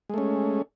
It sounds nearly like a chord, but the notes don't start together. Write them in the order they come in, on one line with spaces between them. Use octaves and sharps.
G#3 A3 C#4